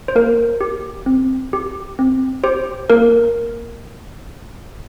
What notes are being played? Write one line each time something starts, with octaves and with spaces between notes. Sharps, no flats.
C5
A#3 A#4
G4
C4
G4
C4
G4 C5
A#3 A#4